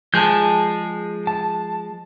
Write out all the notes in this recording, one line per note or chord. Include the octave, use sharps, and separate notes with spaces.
F3 G#3 G#4 A5 G6
A5